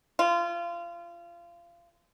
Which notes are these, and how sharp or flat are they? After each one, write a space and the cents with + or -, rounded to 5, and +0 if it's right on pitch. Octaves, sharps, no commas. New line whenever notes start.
F4 -25